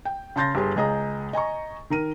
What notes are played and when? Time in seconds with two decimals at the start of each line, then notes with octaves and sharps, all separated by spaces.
0.05 G5
0.36 C#3 A5 C6 G6 A6 A#6
0.55 G1 G4 G#4 C6
0.76 C#2 G#4 D#5 A#5 D#6
1.33 D#5 G#5 A#5 C#6
1.90 D#3 A#4 D#7